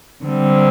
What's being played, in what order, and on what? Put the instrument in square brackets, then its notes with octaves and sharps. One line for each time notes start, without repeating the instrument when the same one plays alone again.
[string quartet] D3 G3 C4